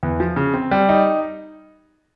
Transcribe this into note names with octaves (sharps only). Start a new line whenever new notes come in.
E2
F3
C#3
C4
G3
D#4